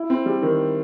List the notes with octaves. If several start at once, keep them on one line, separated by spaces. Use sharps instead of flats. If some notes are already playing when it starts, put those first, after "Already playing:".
Already playing: E4
C4
G3
D#3